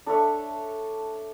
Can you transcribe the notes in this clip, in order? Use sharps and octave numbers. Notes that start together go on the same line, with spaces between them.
D4 A4 C#5 E5